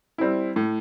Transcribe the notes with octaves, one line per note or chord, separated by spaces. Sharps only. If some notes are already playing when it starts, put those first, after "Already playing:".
G3 C4 E4
A2